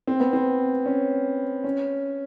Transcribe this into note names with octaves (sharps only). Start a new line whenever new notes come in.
C4
B3
C4
C#4
C#4